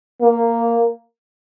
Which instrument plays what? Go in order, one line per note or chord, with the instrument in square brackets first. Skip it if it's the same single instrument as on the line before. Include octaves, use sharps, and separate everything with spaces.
[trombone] A#3